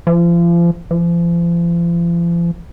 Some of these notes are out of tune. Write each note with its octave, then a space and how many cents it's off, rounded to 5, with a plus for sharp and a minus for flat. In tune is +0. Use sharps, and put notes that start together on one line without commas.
F3 -35
F3 -40